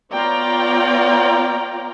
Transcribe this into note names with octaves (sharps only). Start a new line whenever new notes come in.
B3 F4 C#5 D5 G5 A#5